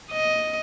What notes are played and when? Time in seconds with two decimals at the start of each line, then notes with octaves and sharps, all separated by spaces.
0.10 D#5